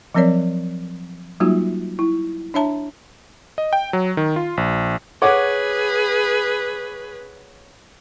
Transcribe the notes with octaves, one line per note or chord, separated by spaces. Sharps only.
F3 F#3 C4 A#4 C#5 D5
F#3 G3 A#3 D#4 F4 F#4
E4
D4 C#5 E5 A5 A#5
D#5
G5
F#3
D#3
F4
A#1
G#4 B4 C#5 F#5 D6